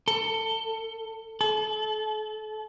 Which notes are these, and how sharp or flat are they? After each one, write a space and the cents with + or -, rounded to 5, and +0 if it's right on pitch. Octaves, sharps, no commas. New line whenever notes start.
A4 +25
A4 -35